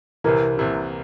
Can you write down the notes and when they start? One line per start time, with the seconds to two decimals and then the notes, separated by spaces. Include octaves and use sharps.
0.24 C2 C3 E3 A#4
0.58 C2 C3 E3